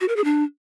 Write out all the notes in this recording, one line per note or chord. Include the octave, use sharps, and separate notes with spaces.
F#4
A#4
G#4
D4